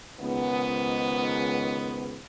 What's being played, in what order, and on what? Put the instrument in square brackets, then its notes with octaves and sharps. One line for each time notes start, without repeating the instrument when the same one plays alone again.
[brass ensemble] C#2 G#2 D#3 B3